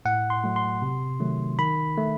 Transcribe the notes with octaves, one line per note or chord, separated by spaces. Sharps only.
A2 F#5
C6
F#3 A3
C6
C3
D#3 F#3 A3
D#3 B5
A3